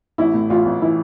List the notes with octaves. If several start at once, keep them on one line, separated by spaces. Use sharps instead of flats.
A1 E4
A2
A1 F4
A1
E3 E4